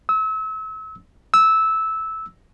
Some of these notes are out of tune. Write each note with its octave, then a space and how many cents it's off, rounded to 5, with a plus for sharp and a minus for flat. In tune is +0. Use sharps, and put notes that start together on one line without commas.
E6 -35
E6 -15